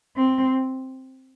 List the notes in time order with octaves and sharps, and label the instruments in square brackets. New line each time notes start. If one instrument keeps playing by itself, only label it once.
[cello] C4